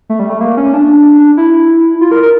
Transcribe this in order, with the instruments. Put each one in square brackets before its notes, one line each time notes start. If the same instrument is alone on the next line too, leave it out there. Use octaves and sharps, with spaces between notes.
[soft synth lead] A3
G3
A3
A#3
C#4
D4
E4
F4
A#4
A#4